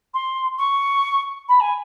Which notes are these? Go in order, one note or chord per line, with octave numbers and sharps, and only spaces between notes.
C6
C#6
B5
G#5